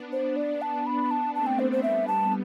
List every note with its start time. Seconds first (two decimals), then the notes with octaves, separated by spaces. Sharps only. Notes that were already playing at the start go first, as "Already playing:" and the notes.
Already playing: B3 D4
0.12 C5
0.36 D5
0.62 A5
0.86 B5
1.11 A5
1.35 A3 C4 A5
1.47 G5
1.59 C5
1.72 C5
1.83 G3 B3 E5
2.08 A5